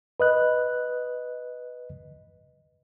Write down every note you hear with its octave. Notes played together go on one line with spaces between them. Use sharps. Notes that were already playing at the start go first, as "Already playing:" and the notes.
B4 D#5 F#6